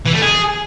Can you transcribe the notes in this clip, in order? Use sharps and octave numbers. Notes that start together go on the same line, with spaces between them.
E3
A3
G#4